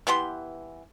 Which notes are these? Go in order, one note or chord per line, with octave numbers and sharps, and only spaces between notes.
E3 B3 G4 C6